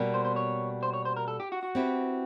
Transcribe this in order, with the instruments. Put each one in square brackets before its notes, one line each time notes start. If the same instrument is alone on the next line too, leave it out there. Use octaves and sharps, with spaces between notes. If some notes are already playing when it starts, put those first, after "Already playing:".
Already playing: [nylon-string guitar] B2 G3 A#3
[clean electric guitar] C5
C5
C#5
C5
C#5
C5
A#4
A4
G4
F#4
F#4
[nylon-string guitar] C4 E4 G4 B4